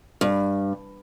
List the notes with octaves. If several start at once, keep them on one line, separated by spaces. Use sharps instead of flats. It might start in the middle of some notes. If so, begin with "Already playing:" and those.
G2